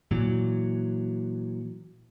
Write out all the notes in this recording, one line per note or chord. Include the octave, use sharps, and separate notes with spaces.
A#2 E3 F#3